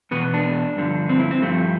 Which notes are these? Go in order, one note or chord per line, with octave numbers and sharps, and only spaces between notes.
E2 B2 B3
D4
G2 D3 F3
C4
E4
C4
G2 F3 A3